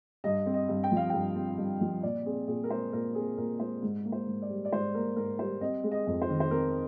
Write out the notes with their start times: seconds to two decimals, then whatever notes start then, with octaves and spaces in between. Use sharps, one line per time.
0.24 G2 D#5
0.46 C4
0.54 D#5
0.69 G2
0.84 G5
0.92 F3 F5
1.10 G2 G5
1.35 C4
1.58 G2
1.81 F3
2.03 A#2 D5
2.26 C4 G#4
2.47 A#2 G#4
2.64 A#4
2.70 G#3 C5
2.93 A#2 A#4
3.15 C4 G#4
3.38 A#2 A#4
3.60 G#3 C5
3.82 G#2
4.05 A#3
4.12 C5
4.27 G#2
4.42 D5
4.49 G3
4.65 D5
4.72 G#2 C5
4.94 A#3 A#4
5.16 G#2 A#4
5.39 G3 C5
5.61 C4 D#5
5.84 G#3
5.91 D#5
6.07 F2
6.22 C5
6.29 D#3
6.40 C5
6.51 C4 A#4